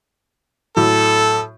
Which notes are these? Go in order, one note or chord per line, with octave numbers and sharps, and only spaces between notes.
A2 F#3 A4